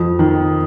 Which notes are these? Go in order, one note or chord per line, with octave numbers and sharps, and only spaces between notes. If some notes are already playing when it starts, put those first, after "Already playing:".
Already playing: F2 F3
D#3